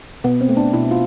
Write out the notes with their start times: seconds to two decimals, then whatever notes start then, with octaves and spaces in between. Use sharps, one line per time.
0.24 B2 B3
0.41 C4
0.49 A3
0.57 D4
0.73 B2 E4
0.91 F4